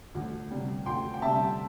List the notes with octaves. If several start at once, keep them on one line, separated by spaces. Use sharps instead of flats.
D2
C3 G3
D2 G5 C6
G5
C3 G3 E5 A5